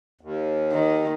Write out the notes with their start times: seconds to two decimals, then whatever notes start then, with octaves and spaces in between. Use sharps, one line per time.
0.21 D#2
0.73 D#3